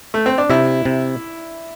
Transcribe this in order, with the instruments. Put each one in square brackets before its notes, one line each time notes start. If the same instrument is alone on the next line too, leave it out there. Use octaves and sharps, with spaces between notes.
[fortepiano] A3
C4
D4
[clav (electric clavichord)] C3 [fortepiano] E4
[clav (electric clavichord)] C3